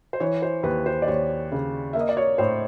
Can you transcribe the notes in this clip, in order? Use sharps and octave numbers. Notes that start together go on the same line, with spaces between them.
C5
E3 C#5
C5
D#2 B4
C5
D5
D#2 C#5
C#3
A#3 E5
D#5
D5
C#5
A2 C5